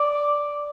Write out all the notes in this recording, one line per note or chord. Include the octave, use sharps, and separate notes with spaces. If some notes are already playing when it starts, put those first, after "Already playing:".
Already playing: D5